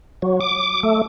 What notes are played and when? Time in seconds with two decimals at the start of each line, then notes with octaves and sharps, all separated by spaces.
0.22 F#3
0.41 D6
0.83 A3